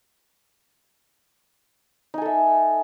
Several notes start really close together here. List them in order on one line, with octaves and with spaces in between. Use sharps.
D#4 G#5 A4 E5